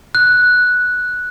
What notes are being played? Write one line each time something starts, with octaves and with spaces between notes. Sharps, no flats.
F#6